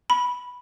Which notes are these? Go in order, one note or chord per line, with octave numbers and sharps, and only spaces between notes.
B5